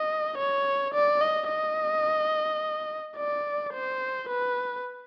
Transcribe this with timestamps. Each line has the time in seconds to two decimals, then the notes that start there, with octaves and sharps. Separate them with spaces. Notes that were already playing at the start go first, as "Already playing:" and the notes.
Already playing: D#5
0.38 C#5
0.94 D5
1.21 D#5
1.49 D#5
3.17 D5
3.74 C5
4.29 B4